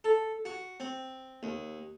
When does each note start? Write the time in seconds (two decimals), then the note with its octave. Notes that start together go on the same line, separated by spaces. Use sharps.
0.04 A4
0.45 F#4
0.80 C4
1.43 D#2